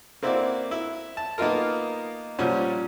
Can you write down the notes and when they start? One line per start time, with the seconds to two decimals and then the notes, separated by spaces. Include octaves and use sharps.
0.23 A#3 C4 E4 F#4 D5
0.71 E4
1.17 A5
1.38 A#3 B3 D#4 F4 A#4
2.39 A#2 F3 G3 C#4 F#4